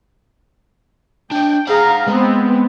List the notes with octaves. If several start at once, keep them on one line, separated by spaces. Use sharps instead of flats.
D4 D#5 G5
G#4 C5 F5 F#5 A#5
G#3 B3 C4